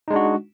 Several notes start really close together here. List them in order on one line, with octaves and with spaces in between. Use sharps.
D#4 G#3 D4 F#4